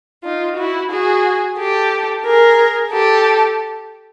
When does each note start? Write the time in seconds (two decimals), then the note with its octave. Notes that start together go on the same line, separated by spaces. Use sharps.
0.25 D#4 F4
0.57 E4 F#4
0.91 F#4 G#4
1.58 G4 A4
2.24 G#4 A#4
2.92 G4 A4